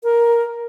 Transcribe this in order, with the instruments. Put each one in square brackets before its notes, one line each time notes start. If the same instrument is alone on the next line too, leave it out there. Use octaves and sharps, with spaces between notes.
[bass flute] A#4